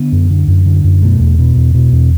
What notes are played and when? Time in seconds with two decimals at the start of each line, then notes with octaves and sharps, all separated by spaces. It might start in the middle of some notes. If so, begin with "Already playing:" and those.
Already playing: D3 B3
0.12 F#2
0.30 D3
0.48 F#2
0.66 D3
0.84 F#2
1.02 B2 A3
1.20 E2
1.38 B2
1.56 E2
1.74 B2
1.92 E2